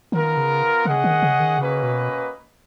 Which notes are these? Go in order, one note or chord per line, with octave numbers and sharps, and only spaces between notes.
D#3 B3 F4 A#4
C#3
C#3 C#4 G#4 D#5 F#5
D#3
C#3
D#3
C#3 A#3 C#4 F#4 B4 D#5
B2